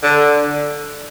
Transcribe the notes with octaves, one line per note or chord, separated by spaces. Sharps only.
D3